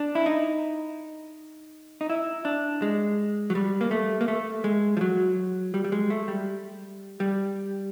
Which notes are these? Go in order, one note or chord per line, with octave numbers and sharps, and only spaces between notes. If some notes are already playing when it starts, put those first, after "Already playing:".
Already playing: D4
E4
D#4
D#4
E4
D4
G#3
F#3
G3
A#3
A3
A#3
A3
G#3
F3
F#3
G3
G3
G#3
A3
G3
G3